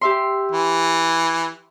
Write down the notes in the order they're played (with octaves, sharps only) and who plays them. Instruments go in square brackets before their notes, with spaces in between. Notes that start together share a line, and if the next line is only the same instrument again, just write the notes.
[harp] G4 E5 C6
[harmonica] E3